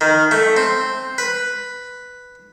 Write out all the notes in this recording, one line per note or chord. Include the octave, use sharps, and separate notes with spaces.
D#3
A3
C4
B4